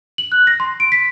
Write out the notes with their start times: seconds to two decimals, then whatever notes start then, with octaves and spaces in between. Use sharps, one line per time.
0.18 F#7
0.32 F#6
0.47 A#6
0.60 C6
0.80 D7
0.92 B6